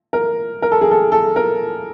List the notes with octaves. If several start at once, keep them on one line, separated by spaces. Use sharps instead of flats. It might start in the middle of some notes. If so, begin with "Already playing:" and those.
A#4
A#4
A4
G#4
A4
A4
A#4